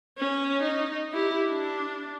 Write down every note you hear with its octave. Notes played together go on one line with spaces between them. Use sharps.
C#4
D#4
E4 G4
D4